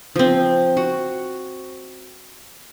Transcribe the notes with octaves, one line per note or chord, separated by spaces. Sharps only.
F3 C4
F#4